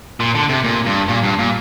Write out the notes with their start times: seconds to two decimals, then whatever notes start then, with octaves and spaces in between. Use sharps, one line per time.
0.20 A#2
0.35 D3
0.49 C3
0.64 A#2
0.86 G2
1.08 A#2
1.24 G2
1.39 A#2